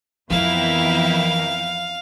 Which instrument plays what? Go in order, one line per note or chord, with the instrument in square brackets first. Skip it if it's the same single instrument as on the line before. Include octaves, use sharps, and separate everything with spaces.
[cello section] F2 B3 A#4 [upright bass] E3 [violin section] E4 E5 G5 [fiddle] F5